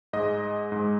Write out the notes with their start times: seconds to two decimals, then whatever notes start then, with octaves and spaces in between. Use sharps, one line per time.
0.13 G#2 G#3 D#5
0.72 G#2 G#3